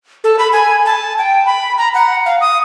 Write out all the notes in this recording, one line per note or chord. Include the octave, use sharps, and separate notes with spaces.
A4
B5
G#5
A5
G5
B5
A#5
F#5
F5
D#6